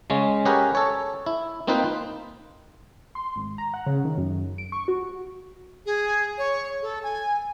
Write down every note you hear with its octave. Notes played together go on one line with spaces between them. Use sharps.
C#3 G#3 C#4
C#4 G4 G#4 A#4 B4 F#5
A4 C#5
E4
A#3 C4 D#4 F4 B4 C5
C6
G#1
A#5
F#5
C#3
D#3
F#2
D7
C#6
F#4
G#4
C#5
A4
G#5